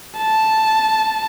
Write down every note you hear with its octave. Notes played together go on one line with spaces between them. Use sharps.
A5